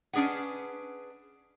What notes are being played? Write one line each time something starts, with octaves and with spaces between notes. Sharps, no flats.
C#4 D4 G#4 B4 F#5